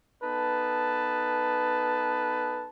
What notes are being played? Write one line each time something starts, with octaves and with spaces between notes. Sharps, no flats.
B3 D#4 A4 B4 A5